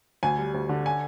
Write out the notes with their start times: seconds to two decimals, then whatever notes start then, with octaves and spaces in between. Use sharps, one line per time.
0.23 D2 G#5
0.38 G3
0.54 D2
0.69 D3
0.86 G#5